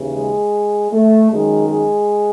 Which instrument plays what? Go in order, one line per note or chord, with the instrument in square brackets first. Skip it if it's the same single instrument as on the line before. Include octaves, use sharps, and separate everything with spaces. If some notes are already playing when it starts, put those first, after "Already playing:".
Already playing: [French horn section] D#2 C#3 E3
G#3
A3
F#2 D#3 G#3
G#3